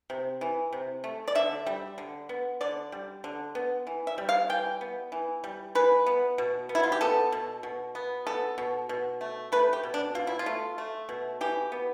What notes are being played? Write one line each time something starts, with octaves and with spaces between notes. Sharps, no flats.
C3
E3
C3
A3
D5
D3 E5
G3
D3
B3
D3 D5
G3
D3
B3
E3
E5
G3
F5
E3 G5
B3
E3
G3
E3 B4
B3
B2
B3
E4
F4
G4
B3 A4
B2
B2
B3
B3 A4
B2
B2
A3
A3 B4
G4
B2
D4
B2 F4
E4
F4
A3
A3
B2
E3 G4
B3